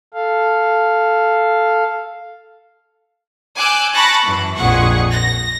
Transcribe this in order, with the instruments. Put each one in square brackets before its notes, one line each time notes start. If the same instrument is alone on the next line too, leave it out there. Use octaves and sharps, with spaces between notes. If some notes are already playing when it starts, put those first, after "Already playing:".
[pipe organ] A4 F5
[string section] G#5 D6 E6 F#6 G6
A5 B5 C#6 F#6 A6 A#6
F#2 E3
A#1 F2 G#4 F#5 C#6
A#6